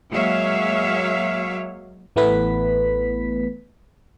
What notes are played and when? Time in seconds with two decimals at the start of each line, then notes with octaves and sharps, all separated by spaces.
0.11 F#3 G#3 A#3 C#5 E5 F5
2.16 A1 E3 A3 B3 B4 B6